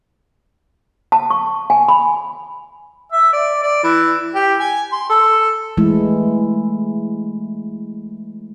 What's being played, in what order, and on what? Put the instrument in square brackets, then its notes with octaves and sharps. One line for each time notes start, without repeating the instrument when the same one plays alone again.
[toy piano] A5
C#6
G#5
B5
[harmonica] E5
D5
D5
E3
G4
G#5
C6
A4
[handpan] E3 G#3 A3 E4